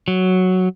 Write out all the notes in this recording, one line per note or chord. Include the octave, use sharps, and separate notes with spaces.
F#3